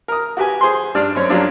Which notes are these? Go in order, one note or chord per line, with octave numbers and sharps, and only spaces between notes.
A#4 D#6
F#4 G4 B4 G#5
G#4 C5 G#5 C6
G2 G3 D4 D5 F6
F#2 C4 C#5
F3 F#3 A#3 C#4 D4 G4